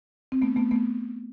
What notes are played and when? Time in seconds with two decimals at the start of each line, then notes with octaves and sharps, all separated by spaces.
0.32 C4
0.42 A3 B3
0.56 A3 B3
0.71 A3 B3